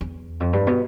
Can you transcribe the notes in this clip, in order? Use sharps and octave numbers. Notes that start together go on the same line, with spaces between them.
E2
F2
G2
B2